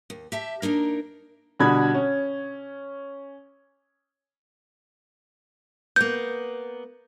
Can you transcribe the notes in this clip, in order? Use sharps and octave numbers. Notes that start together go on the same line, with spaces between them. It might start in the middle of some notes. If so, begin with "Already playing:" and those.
D#2
G4 E5 A5
A#3 D4 D#4 A#4
B2 D3 G3 B5 G#6
C#4
A#3 B3 G6